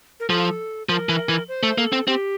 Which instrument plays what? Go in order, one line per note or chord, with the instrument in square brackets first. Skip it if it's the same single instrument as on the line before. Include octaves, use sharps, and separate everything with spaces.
[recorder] A#4
[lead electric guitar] F3 [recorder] A4
[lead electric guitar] F3 [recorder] A#4
[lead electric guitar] E3
E3
[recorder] C5
[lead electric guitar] A3
[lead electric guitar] A#3 [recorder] A4
[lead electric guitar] C4
[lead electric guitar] C4 [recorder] G4